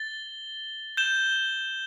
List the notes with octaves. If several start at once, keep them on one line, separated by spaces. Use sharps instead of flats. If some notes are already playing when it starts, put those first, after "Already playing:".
Already playing: A6 G7
G6 E7 G7